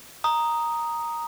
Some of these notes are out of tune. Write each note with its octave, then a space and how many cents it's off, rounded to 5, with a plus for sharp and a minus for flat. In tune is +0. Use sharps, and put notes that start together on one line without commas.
A#5 +0 D#6 +0